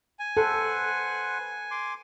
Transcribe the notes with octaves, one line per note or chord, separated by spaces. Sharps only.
G#5
A4 B4 C5 F#5
C6 D6